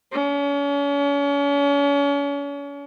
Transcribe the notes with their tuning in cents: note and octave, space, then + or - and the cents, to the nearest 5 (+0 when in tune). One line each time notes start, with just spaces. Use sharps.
C#4 +40